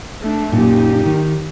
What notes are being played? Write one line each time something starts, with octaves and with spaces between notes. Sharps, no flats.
A3 D4
F#2 A#2 D#4 G4
D#3